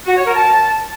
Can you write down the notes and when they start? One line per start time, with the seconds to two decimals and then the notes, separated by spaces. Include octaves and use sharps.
0.06 F#4
0.16 C#5
0.26 A#4
0.35 A5